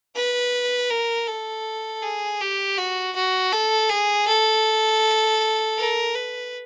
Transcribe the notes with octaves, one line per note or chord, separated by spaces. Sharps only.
B4
A#4
A4
G#4
G4
F#4
F#4
A4
G#4
A4
A#4
B4